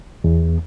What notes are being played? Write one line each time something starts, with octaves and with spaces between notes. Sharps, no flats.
E2